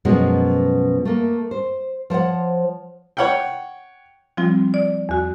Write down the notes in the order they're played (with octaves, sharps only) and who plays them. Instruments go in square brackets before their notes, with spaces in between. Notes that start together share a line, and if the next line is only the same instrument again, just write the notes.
[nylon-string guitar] F#2 B2 F3 G#3 C#4 F#4
A3 A#3
C5
F3 C5 C#5 F#5
[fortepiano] C#5 F#5 G5
[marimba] F3 G3 C4 F4
D5
E2 F#4